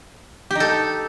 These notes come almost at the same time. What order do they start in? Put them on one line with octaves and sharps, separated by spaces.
G4 D#4 A4